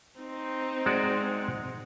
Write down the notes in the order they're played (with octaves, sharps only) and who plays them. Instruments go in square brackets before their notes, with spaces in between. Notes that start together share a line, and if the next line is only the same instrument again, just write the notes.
[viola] C4 D#4
[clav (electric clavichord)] G#3 F#4 D5